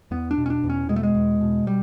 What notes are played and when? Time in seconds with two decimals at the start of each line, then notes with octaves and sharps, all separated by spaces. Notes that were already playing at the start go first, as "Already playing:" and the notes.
0.11 E2 B3
0.31 D4
0.37 B2
0.46 C#4
0.50 D4
0.64 E2
0.70 C#4
0.89 B2 G#3
0.96 A3
1.03 G#3
1.15 E2
1.41 B2
1.67 G3